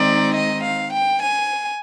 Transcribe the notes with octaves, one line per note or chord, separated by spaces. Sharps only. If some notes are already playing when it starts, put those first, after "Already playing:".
Already playing: D#3 G#3 C4 D#4 D5
D#5
F5
G5
G#5